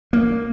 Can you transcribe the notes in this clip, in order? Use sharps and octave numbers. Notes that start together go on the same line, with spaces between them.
A#3